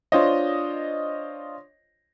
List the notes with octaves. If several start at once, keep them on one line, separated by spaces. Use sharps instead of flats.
D4 F4 C5 C#5 D#5